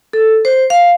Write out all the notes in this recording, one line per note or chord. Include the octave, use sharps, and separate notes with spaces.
A4
C5
F5